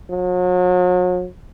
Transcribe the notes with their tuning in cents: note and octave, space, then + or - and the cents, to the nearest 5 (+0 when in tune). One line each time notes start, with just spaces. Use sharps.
F#3 -40